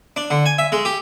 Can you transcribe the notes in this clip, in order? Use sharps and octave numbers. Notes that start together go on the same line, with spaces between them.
D4
D3
G#5
E5
G#3
G4